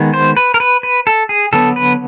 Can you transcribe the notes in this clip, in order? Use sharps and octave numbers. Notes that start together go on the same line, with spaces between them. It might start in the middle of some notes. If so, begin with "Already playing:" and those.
Already playing: D#3 G#3 B3
C5
B4
A#4
B4
B4
A4
G#4
D3 F#3 B3 A4
B4